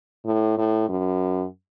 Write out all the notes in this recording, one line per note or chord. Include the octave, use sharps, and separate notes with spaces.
A2
A2
F#2